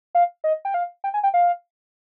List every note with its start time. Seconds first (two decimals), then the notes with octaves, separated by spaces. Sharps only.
0.15 F5
0.44 D#5
0.65 G5
0.74 F5
1.04 G5
1.14 G#5
1.23 G5
1.34 F5